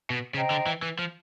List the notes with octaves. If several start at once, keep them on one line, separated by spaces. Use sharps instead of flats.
B2
C#3 C5 D#5 G5 A#5
D3
E3
E3
F3